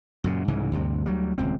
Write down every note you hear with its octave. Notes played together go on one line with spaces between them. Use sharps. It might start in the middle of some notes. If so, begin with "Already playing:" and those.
F#2 A#2 C#3
C2 G#2 C#3 E3
D2 G2 C3
D2 F#3 G3
D#1 C#2 C4